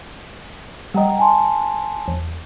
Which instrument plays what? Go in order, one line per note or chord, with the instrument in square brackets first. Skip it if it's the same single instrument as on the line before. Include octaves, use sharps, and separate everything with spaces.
[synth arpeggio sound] G3 D#5 [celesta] F#5 G5 A#5
[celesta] G#5 A5 C6
[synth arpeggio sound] E2